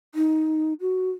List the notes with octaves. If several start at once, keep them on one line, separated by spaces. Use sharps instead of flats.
D#4
F#4